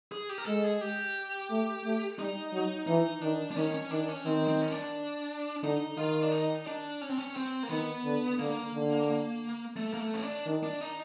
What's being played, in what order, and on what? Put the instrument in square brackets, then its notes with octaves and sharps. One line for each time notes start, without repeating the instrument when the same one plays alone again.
[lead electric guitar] G#4
G4
A#4
[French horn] G#3 [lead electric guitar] A4
[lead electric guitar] G#4
G4
[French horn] A3
A3
[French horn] G3 [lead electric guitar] D#4
[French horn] F#3
[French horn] E3 [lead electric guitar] D#4
[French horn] D#3 [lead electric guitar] D4
[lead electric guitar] D4
[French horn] D#3 [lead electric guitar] C#4
[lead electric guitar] C#4
[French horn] D#3 [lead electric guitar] D4
[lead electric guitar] C#4
[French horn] D#3 [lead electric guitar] C4
[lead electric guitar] C4
C#4
D4
[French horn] D3 [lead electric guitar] D#4
[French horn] D#3 [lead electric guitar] F4
[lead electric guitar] D4
D#4
D4
C#4
C4
C#4
C4
A#3
[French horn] D#3 [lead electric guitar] B3
[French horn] D3
[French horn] D3 [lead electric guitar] A#3
[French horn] D3
[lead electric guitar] A3
A#3
A3
C#4
D4
[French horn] D#3
[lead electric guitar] D4
D#4